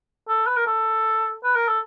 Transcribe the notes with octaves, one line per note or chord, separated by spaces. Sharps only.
A4
B4
A#4
A4
B4
A#4
A4